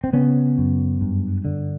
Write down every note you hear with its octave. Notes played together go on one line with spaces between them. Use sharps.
C4
C#3 B3 C#4
F#2
G2
D3